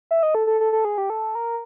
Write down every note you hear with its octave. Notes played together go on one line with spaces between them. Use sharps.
E5
D#5
A4
A4
A4
A4
G#4
G4
A4
A#4